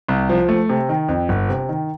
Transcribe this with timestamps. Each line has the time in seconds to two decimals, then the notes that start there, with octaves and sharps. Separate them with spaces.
0.09 C2
0.29 F3
0.49 A3
0.69 C3
0.89 D#3
1.09 F2
1.29 G1
1.49 C3
1.69 D#3